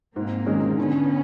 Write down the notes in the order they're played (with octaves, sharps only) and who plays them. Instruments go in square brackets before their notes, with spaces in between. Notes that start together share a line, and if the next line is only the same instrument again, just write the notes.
[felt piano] G#2 [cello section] A#3 C4
[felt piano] D#3 G#3 C#4
[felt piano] D3 [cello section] B3 C#4